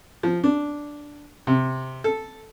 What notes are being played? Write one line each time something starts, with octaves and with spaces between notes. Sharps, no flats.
F3
D4
C3
A4